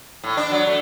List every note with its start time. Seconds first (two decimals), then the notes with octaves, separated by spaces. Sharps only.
0.24 A2
0.37 D4
0.52 F#3
0.67 A3